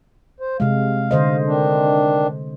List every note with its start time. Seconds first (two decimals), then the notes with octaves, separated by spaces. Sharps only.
0.40 C5
0.60 C3 G#3 F5
1.11 D3 C5 D#5
1.46 D#3 D4